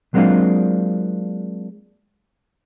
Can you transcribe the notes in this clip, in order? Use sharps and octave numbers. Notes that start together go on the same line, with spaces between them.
F#3 G#3 A#3 C4 D4 F4